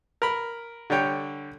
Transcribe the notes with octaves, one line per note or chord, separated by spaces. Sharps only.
A#4 B5
D3 G3 C#5 G5